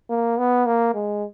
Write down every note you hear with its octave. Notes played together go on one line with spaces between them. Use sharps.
A#3
B3
A#3
G#3